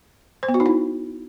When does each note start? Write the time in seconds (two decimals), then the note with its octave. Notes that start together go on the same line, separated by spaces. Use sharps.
0.43 C5
0.49 B3
0.54 F#4
0.60 D#4
0.66 E4